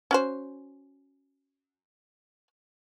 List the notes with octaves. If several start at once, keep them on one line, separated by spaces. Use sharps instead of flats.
C#4 F#4 C5